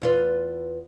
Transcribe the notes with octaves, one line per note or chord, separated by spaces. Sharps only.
E2 F4 B4